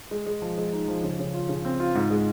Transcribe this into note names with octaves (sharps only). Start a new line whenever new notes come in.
G#3
G#3
F3
G#3
D#4
F3
C#3
C#3
F4
C#3
C4
F4
G#2
G#3